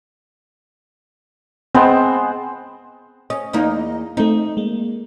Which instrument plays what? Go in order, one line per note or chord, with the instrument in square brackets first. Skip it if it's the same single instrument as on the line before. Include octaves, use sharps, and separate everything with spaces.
[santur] G#3 B3 C5 [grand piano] C4
[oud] C#4 [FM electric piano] D#5
[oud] E2 A#3 D#4
[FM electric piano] A3 C4 [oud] D#4
[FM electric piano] G#3 A#3